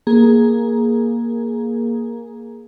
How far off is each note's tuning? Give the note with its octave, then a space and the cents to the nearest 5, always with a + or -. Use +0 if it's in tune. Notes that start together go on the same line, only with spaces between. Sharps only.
A#3 +5 G#4 +0